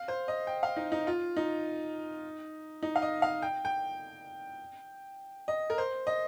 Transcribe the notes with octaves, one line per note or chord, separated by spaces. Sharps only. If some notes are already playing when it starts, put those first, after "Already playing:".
Already playing: F5
C5
D#5
G5
F5
D#4
D#4
F4
D#4
D#4
F5
D#5
F5
G5
G5
D#5
A#4
C5
D#5